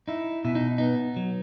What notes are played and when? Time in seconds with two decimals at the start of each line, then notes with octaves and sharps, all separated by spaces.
0.08 D#4 E4
0.45 B2 E4
0.55 D#4
0.78 B3 D#4
1.16 F#3